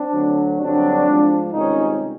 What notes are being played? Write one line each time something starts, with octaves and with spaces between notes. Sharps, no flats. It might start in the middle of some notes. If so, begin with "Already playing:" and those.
Already playing: C4 D4
D2 D3 F#3
G2 D3 F#3 C4 D4
G#2 F3
C#2 C3 D#3 G3 C#4 D#4